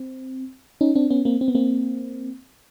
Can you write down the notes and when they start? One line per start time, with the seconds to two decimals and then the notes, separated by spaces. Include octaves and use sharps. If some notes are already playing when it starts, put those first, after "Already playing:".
Already playing: C4
0.81 C#4 D#4
0.96 C4 D4
1.10 B3 C#4
1.25 A#3 C4
1.41 C4
1.48 B3
1.55 A#3 C4